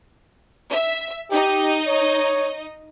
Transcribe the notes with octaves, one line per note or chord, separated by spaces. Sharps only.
E5
D#4 G4 D#5
C#5